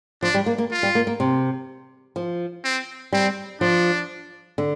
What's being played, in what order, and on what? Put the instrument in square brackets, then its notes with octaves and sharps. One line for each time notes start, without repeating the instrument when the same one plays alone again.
[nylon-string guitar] F3 [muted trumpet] D4
[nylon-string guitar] G3
A#3
A#3
[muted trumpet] F4
[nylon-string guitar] G3
A#3
A#3
C3
F3
[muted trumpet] C4
[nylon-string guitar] G3 [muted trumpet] C4
[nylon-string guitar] F3 [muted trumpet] D4
[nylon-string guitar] D3